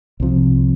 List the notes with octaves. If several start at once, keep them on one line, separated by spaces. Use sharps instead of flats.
C2 C3 F3